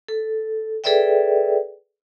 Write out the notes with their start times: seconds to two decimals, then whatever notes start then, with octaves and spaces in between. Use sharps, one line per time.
0.08 A4
0.84 G#4 A4 B4 D5 E5 G5